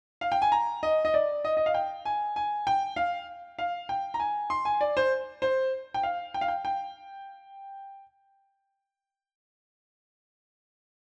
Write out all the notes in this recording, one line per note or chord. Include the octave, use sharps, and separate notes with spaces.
F5
G5
G#5
A#5
D#5
D#5
D5
D#5
D#5
F5
G5
G#5
G#5
G5
F5
F5
G5
A#5
G#5
C6
G#5
D5
C5
C5
G5
F5
G5
F5
G5
G5